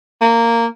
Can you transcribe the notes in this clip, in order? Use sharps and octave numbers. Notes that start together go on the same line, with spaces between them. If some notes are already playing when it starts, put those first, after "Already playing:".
A#3